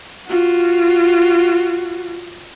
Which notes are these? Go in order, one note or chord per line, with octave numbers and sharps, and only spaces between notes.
F4 F#4